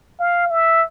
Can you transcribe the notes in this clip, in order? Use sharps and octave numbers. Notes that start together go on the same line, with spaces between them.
F5
E5